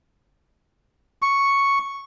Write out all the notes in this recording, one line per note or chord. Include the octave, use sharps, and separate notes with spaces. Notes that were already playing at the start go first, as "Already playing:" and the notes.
C#6